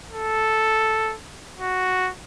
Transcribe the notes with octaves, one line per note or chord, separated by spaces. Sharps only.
A4
F#4